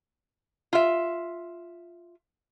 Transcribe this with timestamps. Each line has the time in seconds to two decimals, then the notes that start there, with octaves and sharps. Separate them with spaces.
0.73 F4 E5